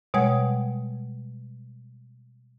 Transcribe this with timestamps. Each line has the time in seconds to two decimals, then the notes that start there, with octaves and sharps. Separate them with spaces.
0.14 B2 G3 G#3 C#5 F#5 G#6